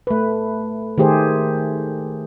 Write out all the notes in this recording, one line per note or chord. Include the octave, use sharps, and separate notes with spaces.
A3 B4
D#3 A3 G4 G#4 C5